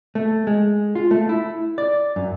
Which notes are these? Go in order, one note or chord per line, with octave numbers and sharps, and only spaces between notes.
A3
G#3
F4
A3
E4
D5
F#2